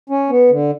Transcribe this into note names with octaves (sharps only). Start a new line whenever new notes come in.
C#4
B3
D3